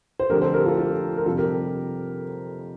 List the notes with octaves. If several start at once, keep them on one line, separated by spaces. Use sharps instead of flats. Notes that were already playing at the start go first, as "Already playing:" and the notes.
C5
F2 D3 A3 D4 G4 A#4
A4 C5
G4 A#4
F4 A4
F4 A4
A#4
F2 C3 G3 F4 A4
G4 A#4